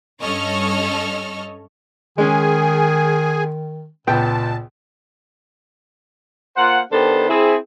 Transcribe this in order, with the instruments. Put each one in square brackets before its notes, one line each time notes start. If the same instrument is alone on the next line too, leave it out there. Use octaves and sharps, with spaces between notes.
[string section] G2 C#4 A4 D#5 C#6 F6
[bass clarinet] D#3 [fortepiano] G#3 C#4 [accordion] G#4 G#5
[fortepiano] C#2 B3 G5 [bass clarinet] A#2 [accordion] A5
[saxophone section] A#3 F4 C5 F#5
D#3 B3 D4 G4 A4 C5
C4 E4 G#4